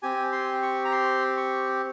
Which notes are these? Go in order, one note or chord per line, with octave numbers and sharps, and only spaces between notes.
C4 G4 G#5
C6
C#6
A#5
C6
C#6